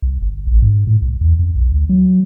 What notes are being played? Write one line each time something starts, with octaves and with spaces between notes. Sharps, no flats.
C2
G1
A1
G#2
A2
C2
E2
F2
B1
D2
F#3